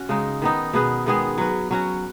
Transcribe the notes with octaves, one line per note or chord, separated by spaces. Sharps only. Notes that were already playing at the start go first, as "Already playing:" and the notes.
Already playing: C#4 F#4
C#3 G#3 D#4
D#3 B3 D#4
B2 B3 G#4 B4
D#3 G#3 B3 G#4
F#3 C#4 B4
F#3 C#4 F#4